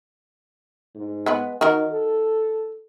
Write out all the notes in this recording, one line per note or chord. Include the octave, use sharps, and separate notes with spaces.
G#2
G#3 B3 B4
D#3 D#4 F#4 A#4
A4